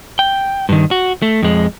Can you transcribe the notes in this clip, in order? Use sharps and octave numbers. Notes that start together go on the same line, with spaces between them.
G5
G2 D#3
F#4
A3
F2 G#3